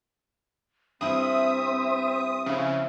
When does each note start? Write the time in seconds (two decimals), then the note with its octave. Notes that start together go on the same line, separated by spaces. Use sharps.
1.01 G2 C4 E4 E5 G5 D#6
2.46 C#3 F3 E4